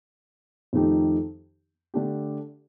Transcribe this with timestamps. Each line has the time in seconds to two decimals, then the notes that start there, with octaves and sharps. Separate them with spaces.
0.73 F2 D#3 A3 D#4 G4
1.94 D3 A3 D4 G4